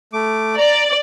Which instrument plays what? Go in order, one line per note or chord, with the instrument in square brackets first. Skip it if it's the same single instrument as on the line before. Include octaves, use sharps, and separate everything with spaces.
[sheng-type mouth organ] A3 D6
[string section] D5 [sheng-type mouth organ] A#5